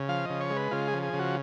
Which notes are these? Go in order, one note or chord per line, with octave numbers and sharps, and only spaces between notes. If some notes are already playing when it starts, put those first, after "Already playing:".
Already playing: C#3
F3 F5
C#3 D#5
C#5
G#3
B4
C#3 F4
G#4
F3
G#4
C#3
F#4